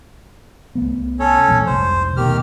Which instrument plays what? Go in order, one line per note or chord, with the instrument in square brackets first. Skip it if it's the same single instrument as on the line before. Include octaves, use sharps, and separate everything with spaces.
[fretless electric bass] C2 A3 B3
[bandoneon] C#4 A4 C#5
[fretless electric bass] A#1 E2 A3
[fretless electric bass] F1 C2 G#2 [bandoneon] C5
[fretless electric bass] D#2 B2 A3 [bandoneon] D#3 G4 F6